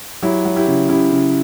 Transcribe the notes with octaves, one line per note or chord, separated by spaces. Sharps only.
F#3 E4 G4
F#3
E4 G4
C#3
C#3 E4 G4
C#3